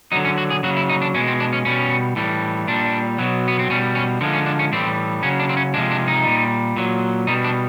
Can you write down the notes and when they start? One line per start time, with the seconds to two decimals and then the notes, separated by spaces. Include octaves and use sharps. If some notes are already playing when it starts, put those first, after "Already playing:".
0.12 D3 F#3 D#4
0.25 C#4
0.38 F#4
0.50 G#4
0.63 C#3 F#3 F#4
0.77 E4
0.89 D#4
1.02 D4
1.14 B2 G#3 C#4
1.27 C4
1.40 D4
1.53 C#4
1.65 B2 G3 C#4
2.16 A2 E3 G3
2.67 A#2 G3 D4
3.18 B2 F#3
3.48 B3
3.59 C4
3.70 B2 G3 C#4
3.95 C#4
4.21 D3 F3 G#3 C4
4.33 C#4
4.46 D4
4.59 C#4
4.72 A2 E3 G3 C4
5.23 C#3 F#3 C#4
5.39 D4
5.49 C4
5.57 C#4
5.74 G#3 D4
5.76 C3 F3
5.91 D4
6.08 D#4
6.24 A#2 G3
6.76 A#2 F#3
7.27 B2 G3 D#4
7.44 D4